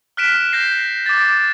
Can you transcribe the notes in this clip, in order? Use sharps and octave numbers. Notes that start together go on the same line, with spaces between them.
F6 F#6 B6 D7 E7
G6 A#6 C7
D6 A6